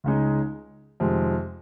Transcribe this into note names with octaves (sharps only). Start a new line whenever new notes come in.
C#2 C#3 G#3 D#4
F2 C3 D#3 G#3